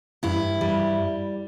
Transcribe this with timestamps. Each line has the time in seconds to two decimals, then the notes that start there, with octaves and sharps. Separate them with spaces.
0.23 G2 E4
0.61 G3